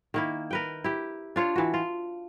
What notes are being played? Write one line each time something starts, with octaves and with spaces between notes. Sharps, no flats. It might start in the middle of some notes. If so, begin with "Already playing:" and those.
D#3 A#3 E4
A#4 B4 G5
E4 G4
D4 F4 C#5
E3 F#4
F4